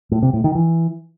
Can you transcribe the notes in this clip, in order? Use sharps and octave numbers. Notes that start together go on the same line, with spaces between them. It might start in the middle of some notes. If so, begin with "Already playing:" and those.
A2
C3
A2
D#3
E3